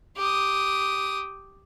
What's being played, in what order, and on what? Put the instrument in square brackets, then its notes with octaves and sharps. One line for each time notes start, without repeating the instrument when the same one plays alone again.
[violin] G4 D#6